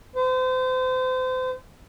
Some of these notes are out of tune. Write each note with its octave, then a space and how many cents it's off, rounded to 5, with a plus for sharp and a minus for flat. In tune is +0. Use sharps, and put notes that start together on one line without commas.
C5 -35